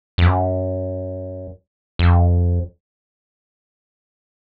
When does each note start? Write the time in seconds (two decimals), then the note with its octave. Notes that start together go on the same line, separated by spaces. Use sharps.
0.18 F2
0.26 F#2
1.99 F2